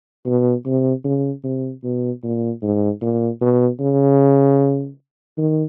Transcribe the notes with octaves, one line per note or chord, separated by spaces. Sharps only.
B2
C3
C#3
C3
B2
A#2
G#2
A#2
B2
C#3
D#3